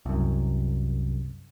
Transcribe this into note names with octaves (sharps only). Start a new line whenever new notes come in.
C2 F#2